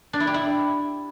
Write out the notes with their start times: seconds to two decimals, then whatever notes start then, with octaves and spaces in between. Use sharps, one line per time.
0.13 D4
0.20 E4
0.27 G4
0.34 E4